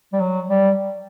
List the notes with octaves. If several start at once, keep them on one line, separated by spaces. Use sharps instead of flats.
G3
F#3
G3